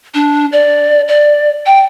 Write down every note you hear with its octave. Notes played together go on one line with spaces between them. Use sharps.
D4
D5
D5
G5